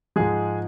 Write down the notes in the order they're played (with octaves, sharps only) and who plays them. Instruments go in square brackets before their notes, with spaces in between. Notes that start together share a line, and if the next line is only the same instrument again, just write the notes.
[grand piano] G#2 F3 G#3 G#4